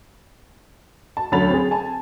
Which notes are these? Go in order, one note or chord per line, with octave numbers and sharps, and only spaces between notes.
A5
D2 F#3 C#4 B5 A6 F7
C4 G#4
G#5 A5